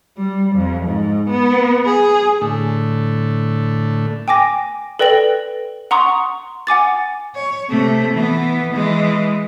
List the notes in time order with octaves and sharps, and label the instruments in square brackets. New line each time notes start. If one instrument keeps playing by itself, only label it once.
[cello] G3
F2
G#2
B3
G#4
[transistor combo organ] A2 D3 A3
[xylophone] G5 G#5 D6 A#6
A4 B4 D5 G5 A#6 F#7
F#5 A#5 C6 C#6 D#6
F#5 G#5 D6 A6
[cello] C#5
C3 A3
E3 B3
E3 G#3